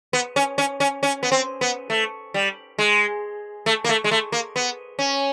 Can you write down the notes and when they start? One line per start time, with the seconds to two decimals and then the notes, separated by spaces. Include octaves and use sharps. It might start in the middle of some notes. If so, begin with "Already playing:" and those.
0.13 B3
0.36 C#4
0.58 C#4
0.80 C#4
1.03 C#4
1.23 B3
1.32 C4
1.61 B3
1.90 A3
2.34 G3
2.78 G#3
3.66 A3
3.84 A#3
3.89 A3
4.04 G#3
4.11 A3
4.32 A#3
4.56 B3
4.99 C#4